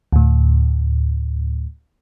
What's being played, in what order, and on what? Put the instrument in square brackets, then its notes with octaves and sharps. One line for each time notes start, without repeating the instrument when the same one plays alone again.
[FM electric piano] D2 A2